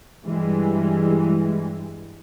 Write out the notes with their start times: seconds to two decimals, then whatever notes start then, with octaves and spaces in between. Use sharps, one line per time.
0.23 G2 E3 G3 G#3